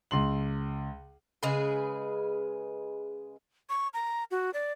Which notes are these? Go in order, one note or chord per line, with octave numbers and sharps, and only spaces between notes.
C#2 C6 F#7
C#3 G#3 G#4 B4
C#6
A#5
F#4
D5